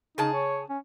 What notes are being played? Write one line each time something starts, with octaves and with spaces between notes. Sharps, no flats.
C#3 D#4 G#4 A5
C#5
C#4